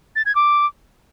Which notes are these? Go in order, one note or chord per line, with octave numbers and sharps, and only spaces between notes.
A6
G#6
D6